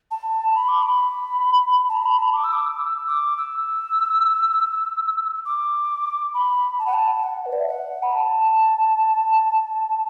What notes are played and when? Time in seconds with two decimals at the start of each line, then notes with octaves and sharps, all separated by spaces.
0.11 A5
0.55 B5
0.68 D6
0.83 B5
1.89 A5
1.97 B5
2.06 A5
2.13 B5
2.22 A5
2.33 D6
2.44 E6
2.53 D6
2.78 E6
3.07 D6
3.38 E6
5.45 D6
6.34 B5
6.79 A5
6.86 F#5
6.93 A5
7.23 F#5
7.46 B4
7.52 D5
7.60 E5
7.68 F#5
8.03 B5
8.12 A5